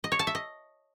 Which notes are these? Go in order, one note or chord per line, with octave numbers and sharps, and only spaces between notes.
D#5
C#5
A5
E5
D#5